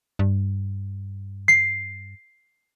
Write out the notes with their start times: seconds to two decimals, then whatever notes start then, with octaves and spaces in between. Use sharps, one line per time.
0.19 G2
1.48 C7